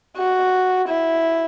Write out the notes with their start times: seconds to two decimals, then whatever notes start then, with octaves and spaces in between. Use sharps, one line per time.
0.18 F#4
0.89 E4